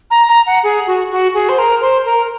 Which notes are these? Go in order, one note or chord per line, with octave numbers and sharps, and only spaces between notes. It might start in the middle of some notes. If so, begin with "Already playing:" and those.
A#5
A#5
F#5
G#4
F#4
F#4
G#4
C5
A#4
C5
A#4